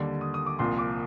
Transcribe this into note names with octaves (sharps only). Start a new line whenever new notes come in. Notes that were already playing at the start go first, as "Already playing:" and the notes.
Already playing: D#2 D3 G3
D#6
D#6
D6
C2 A#2 F3 C6
D6